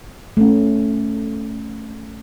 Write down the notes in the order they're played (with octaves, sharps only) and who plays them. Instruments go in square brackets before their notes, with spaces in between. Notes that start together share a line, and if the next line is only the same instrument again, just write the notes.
[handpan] A3 C#4